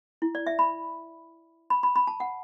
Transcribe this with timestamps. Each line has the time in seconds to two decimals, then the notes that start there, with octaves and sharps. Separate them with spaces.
0.22 E4
0.35 D5
0.47 E5
0.59 B5
1.70 B5
1.83 B5
1.96 B5
2.07 A5
2.20 F#5